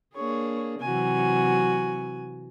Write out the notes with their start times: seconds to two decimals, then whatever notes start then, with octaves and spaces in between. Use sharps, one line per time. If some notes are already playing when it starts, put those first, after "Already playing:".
0.16 A#3 D4 G#4 C#5
0.81 C3 E3 F#3 F#4 G#5